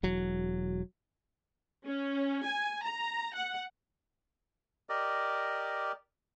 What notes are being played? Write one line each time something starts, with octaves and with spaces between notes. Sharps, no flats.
E1 F#3
C#4
G#5
A#5
F#5
G4 A#4 D5 D#5